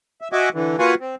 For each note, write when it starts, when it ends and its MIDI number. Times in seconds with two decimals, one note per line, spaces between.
0.21 0.28 76
0.32 0.49 66
0.32 0.49 75
0.32 0.49 76
0.32 0.49 78
0.32 0.49 80
0.32 0.49 86
0.54 0.77 50
0.54 0.77 52
0.79 0.95 58
0.79 0.95 65
0.79 0.95 66
0.79 0.95 71
0.79 0.95 78
0.79 0.95 80
1.01 1.15 60